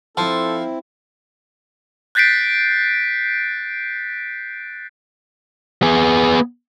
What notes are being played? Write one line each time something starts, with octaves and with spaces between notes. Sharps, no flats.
F3 C4 E4 A4 A5 C6
F#6 G6 A6 B6 C7 D7
B3 G#4